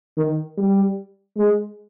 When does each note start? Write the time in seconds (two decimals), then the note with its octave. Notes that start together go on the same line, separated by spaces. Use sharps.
0.17 D#3
0.57 G3
1.38 G#3